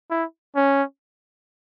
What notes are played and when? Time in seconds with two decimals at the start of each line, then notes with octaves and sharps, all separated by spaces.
0.10 E4
0.56 C#4